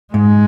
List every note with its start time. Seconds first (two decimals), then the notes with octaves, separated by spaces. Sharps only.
0.13 G#2 G#3